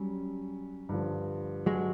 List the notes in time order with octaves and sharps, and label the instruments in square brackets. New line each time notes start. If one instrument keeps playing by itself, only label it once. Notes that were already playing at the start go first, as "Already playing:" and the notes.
Already playing: [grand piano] F#3 C#4 [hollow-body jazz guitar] G3
[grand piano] G2 D3 F3
[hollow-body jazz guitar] F#3 G#3